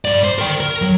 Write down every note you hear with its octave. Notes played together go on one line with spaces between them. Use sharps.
G2 D5
C5
A#4 G5
A#4
F#3